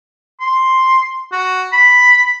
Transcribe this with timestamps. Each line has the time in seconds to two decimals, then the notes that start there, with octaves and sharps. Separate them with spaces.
0.41 C6
1.32 F#4
1.73 B5